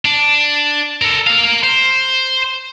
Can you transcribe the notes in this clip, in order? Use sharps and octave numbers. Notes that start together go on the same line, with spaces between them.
D4
A4 A#4
A#4 F5
C5